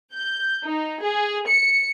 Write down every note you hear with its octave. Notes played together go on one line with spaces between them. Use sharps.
G6
D#4
G#4
C#7